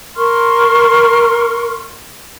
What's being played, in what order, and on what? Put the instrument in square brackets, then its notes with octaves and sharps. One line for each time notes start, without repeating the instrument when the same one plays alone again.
[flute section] A#4 C6 C#6 F6